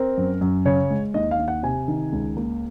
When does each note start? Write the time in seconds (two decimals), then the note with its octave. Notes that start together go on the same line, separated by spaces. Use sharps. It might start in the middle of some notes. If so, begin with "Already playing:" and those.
Already playing: C4 A#4
0.17 F#2
0.41 F#2
0.65 C#3 C#5
0.90 G#3
1.14 D#2 D#5
1.31 F5
1.39 D#2
1.48 F#5
1.63 C3 G#5
1.88 D#3
2.12 C#2
2.37 A#3